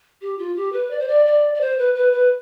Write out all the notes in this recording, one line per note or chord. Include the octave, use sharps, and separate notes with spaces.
G4
F4
G4
B4
D5
C5
D5
D5
D5
C5
B4
B4
B4